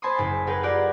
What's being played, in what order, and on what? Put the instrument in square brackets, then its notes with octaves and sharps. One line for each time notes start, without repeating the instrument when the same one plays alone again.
[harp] C5 G#5 A5 B5 C6 D#6
F#1 B6
G#4 A#4 B4 F#5 G5
F4 G4 A#4 B4 D5 F#5